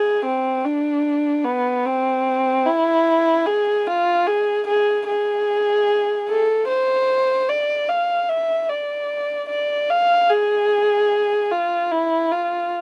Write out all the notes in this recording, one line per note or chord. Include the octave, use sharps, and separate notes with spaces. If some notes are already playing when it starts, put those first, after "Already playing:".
Already playing: G#4
C4
D4
B3
C4
E4
G#4
F4
G#4
G#4
G#4
A4
C5
D5
F5
E5
D5
D5
F5
G#4
F4
E4
F4